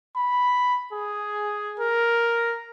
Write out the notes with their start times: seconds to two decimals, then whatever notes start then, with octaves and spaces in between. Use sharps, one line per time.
0.16 B5
0.92 G#4
1.79 A#4